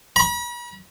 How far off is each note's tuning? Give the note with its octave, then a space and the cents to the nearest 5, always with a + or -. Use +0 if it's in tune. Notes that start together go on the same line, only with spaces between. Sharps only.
B5 -45